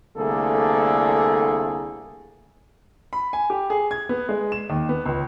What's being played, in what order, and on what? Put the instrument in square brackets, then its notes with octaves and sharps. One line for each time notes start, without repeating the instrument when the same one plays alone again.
[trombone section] C2 D3 A3 A#3 G#4 A4
[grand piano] B5
G#5
G4
G#4
G#6
B3
G#3
E7
D#2
B3
C#2